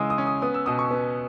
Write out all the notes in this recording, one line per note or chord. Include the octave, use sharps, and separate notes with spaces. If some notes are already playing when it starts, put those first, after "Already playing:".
Already playing: C#3 E3 G#3 D#6 E6
D#6
C#4
D#6
B3 D#6
E6
B2 D#6
C#6
B3